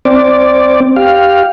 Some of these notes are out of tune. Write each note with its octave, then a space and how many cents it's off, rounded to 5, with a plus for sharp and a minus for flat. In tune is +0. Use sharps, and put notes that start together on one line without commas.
C4 +0 D5 +0
G4 +5 F5 +0